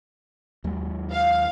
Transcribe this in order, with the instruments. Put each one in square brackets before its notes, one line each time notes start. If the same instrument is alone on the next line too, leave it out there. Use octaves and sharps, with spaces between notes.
[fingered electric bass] D#2 F#3 G#3
[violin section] F5